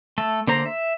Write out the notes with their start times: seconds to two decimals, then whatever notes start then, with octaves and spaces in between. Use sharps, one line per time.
0.18 A3 A4
0.47 D3 A#3 C5 A#5
0.66 E5